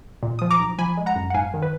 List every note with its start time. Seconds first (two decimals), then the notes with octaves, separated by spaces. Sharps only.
0.23 A#2
0.39 F3 D#6
0.51 A#5 D6
0.60 B1
0.79 F3 G#5 B5
0.97 G#3
1.06 F#5 A#5
1.16 F#2
1.30 F#5
1.34 G#2 F5 G#5
1.54 D#3
1.62 B4